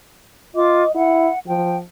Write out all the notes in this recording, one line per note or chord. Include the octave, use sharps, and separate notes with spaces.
F4 D#5 D6
E4 F#5
F3 G5